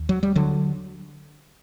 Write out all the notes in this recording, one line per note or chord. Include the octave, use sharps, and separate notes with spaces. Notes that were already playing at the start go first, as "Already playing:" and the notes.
Already playing: D#2
F#3
G3
D3 F#3